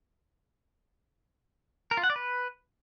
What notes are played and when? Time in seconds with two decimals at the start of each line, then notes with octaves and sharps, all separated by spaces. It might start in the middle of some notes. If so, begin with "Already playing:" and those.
1.91 A#4
1.97 F4
2.04 F#5
2.10 D5
2.16 B4